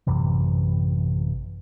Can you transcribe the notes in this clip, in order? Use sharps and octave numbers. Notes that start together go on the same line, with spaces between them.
A1 F#2 C3 E3